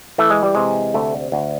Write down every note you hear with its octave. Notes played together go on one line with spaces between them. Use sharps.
E3 A3
G#3
G3
C3 G#3
D2 A3
D2